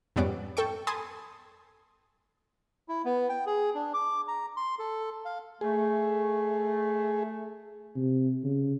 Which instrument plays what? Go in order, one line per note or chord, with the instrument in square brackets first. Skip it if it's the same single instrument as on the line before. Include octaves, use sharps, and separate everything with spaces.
[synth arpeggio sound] F2 G#2 G3 B3 C#4 D6
A4 G5 C#6
G#5 A5 B5 C6 D#6
[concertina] E4
B3
G5
G#4
D4
D6
A#5
C6
A4
F5
[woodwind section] A3 [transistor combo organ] G#4
[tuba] C3
C#3